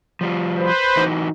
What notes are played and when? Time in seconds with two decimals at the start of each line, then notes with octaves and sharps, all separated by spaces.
0.21 F3 G3 F4
0.58 B4 C5
0.97 E3 D#4 F#4